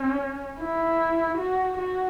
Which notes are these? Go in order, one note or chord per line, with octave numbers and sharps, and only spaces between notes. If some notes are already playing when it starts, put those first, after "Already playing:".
Already playing: C#4
E4
F#4
F#4